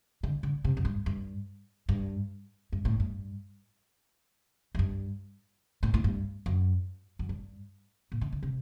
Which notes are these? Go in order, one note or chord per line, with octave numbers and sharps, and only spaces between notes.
D3
D3
C3
F#2
G2
G2
G2
G2
A2
G2
F#2
G2
A2
A2
G2
F#2
F#2
G2
A#2
D#3
D3
C3